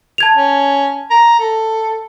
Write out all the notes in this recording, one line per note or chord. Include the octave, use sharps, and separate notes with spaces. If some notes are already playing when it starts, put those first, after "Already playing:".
A5 G#6 F7
C#4
A#5
A4